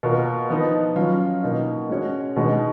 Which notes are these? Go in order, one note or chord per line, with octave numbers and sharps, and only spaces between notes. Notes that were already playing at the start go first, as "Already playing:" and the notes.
B2 A#3 F4 A#4
F3 B3 D#4
F#3 C#4 F4
B2 A#3 D#4
G#3 C#4 F#4 C#5
B2 G#3 D#4